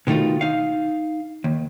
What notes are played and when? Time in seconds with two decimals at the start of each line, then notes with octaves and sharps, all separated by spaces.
0.07 B2 D#3 A3 D#4 F4
0.41 D#4 F5
1.44 D#2